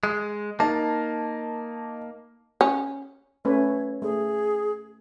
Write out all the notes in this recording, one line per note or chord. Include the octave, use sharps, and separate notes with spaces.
G#3
A#3 D#4 A5
C#4
A3 C#4 B4 C#5
A3 G#4